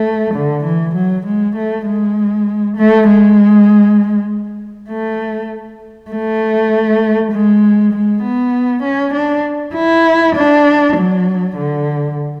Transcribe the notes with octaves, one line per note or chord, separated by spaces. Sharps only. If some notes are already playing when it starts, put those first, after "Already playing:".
Already playing: A3
D3
E3
F#3
G#3
A3
G#3
A3
G#3
A3
A3
G#3
G#3
B3
C#4
D4
E4
D4
F#3
D3